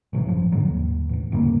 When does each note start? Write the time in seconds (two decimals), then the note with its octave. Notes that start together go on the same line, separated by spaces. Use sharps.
0.13 A1 C3 E3 F#3
0.26 G#1 F#2 F3
0.52 A1 G#2 D3 F#3
0.68 D#2
1.09 E1 A1
1.32 D2 G2 C#3 A#3